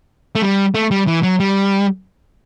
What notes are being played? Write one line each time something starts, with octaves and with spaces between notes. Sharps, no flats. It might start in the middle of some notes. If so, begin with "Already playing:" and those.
A3
G3
A3
G3
E3
F#3
G3